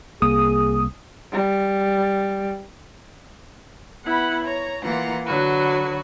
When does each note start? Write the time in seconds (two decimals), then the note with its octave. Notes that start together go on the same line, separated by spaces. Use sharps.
0.22 C2 A#3 G#4 D#6
1.32 G3
4.04 B3 E4 F#5 B5
4.44 C#5 A#5
4.82 E3 A#3 F4 F#5 A#5
5.26 D3 F#3 F#4 B4